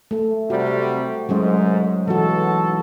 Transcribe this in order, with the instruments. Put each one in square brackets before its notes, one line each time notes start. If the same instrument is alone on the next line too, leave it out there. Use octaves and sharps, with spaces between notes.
[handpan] A3 A4
[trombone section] C3 G3 [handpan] F#4
[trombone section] C2 G#2 [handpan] F#3 G#3 C#4
[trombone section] B1 A4 [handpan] E3 F#4